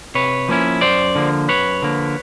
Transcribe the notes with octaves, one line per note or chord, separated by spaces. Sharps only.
C3 B4 C#5
F3 A#3 C#4 E4
F#2 C5 D5
D3 F3 A#3
F#2 B4 C#5
D3 F3 A#3